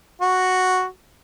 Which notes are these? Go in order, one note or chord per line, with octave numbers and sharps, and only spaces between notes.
F#4